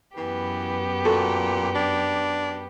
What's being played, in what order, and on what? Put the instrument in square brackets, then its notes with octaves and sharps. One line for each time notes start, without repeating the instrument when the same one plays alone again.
[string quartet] F#2 B3 G4 [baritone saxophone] E3
[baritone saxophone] A#2 [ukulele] F#4 A4
[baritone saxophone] D4